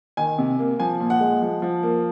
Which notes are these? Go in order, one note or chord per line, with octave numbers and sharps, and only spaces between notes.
D#3 G#5
C3
A#3
F3 G#5
A#2
F#5
G#3
F3
F3
A#3